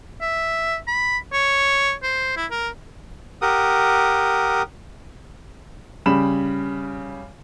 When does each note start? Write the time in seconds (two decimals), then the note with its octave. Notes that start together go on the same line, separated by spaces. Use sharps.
0.21 E5
0.87 B5
1.33 C#5
2.03 C5
2.37 E4
2.51 A#4
3.41 G4 A#4 F#5 D#6
6.06 C#3 G3 B5 E7